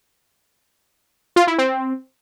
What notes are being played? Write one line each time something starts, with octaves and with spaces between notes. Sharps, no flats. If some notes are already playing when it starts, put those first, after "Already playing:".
F4
E4
C4